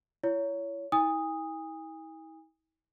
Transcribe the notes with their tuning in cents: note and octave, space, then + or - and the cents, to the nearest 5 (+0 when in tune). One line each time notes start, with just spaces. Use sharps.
E4 +30 C#5 +20
E4 -45 G#5 -35 D#6 +0